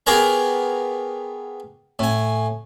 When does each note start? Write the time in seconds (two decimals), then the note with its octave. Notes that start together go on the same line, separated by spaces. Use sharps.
0.06 B3 G4 G#4 A#4 C#5 A#5
1.99 A2 G#5